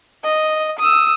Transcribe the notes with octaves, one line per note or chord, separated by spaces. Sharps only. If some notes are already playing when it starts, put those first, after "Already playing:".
D#5
D#6 E6